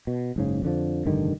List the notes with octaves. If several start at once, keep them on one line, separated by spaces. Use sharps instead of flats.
B2
F#1 G#2 C#3
F2 D3 F3
F1 G2 D3 D#3